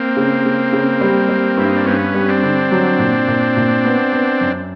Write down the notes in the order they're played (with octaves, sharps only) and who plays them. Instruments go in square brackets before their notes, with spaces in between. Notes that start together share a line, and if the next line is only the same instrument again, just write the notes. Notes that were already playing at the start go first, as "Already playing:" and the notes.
Already playing: [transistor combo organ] A#3 C4
[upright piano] C#3
C#3
C#3
G3
G3
[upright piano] G2 [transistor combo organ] E4
[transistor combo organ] D#4
D4
[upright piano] G2 [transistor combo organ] B3 C#4
[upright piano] G3
[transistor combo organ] C4 D4
[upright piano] D3
F#3
A#2
A#2
A#2
B3
B3
F#2